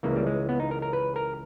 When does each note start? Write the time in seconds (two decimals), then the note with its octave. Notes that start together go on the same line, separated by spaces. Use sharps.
0.03 C#2 C#3 E3 A#3
0.16 G3
0.26 G#3
0.49 B3
0.60 D#4
0.71 A#4
0.82 A#4
0.93 B4
1.16 A#4